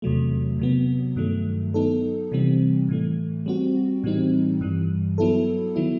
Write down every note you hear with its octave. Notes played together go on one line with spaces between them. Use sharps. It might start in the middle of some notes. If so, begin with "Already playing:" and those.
E2 C3 F#3 A3
C3 F#3 B3
G2 D#3 F#3 A3
F#3 B3 D#4 A4
C3 E3 G3 C4
A2 E3 A3
G3 C4 F#4
A2 E3 G3 C4 D#4
G2 E3 G3
F#3 B3 E4 A4
D#3 F#3 B3 E4